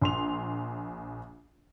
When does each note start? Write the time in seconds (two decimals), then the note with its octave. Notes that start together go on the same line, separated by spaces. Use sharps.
0.01 A#1 C6 F7